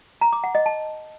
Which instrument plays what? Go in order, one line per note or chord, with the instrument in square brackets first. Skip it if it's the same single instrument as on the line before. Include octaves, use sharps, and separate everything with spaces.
[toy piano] A#5
D6
F#5
D#5
A5